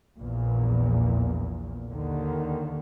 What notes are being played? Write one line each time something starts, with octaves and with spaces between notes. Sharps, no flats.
A#1 E2 A#2
D#2 D3 D#3